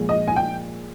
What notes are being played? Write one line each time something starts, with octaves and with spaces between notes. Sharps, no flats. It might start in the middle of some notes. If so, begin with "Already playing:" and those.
Already playing: A#2 F3 G#3
D#5
G#5
G5